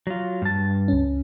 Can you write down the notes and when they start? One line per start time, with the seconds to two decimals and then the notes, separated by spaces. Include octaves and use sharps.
0.07 F#3 F4
0.42 G2 A5
0.88 C#2 C#4